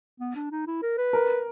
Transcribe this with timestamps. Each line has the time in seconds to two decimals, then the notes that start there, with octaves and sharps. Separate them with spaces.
0.20 B3
0.35 D4
0.51 D#4
0.67 E4
0.82 A#4
0.98 B4
1.13 A#4